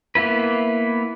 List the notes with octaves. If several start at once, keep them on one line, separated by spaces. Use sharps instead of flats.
A#3 B3 E4 B4